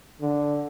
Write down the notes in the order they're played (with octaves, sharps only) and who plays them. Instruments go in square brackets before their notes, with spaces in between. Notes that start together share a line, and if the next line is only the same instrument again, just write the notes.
[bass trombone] D3